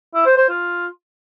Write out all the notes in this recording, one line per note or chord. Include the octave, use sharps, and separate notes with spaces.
E4
C5
C5
F4